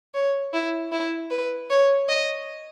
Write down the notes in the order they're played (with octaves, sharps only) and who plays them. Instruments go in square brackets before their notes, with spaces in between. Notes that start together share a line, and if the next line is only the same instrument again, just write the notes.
[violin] C#5
E4
E4
B4
C#5
D#5